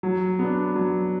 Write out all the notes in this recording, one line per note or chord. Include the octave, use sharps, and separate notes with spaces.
F#3
B3 D4
F#3